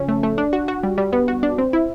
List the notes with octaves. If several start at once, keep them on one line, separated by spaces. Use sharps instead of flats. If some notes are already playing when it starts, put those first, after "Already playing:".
Already playing: C#3 F3 C#4
A3
A3
D4
F#4
F#4
G3
G3
B3
F#4
D4
C4
E4